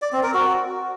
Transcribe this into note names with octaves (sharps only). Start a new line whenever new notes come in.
D5
C4
A#4
F#4